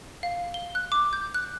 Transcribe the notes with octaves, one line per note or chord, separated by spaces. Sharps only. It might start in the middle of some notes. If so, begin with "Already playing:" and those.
F5
G7
F#6
D6
G6
F#6